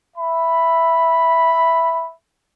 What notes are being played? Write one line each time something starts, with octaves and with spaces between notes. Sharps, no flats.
E5 B5